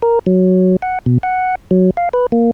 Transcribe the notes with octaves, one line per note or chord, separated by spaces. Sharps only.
A#4
F#3
F#5
B2
F#5
F#3
F5
B4
A#3